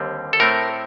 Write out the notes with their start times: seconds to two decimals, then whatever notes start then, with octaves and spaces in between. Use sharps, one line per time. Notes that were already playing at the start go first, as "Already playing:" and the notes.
Already playing: D#2 D3 G3 C4
0.33 A4
0.40 A2 A3 C4 A#4